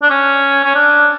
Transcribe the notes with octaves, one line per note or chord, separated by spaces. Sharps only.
D4
C#4
C#4
D4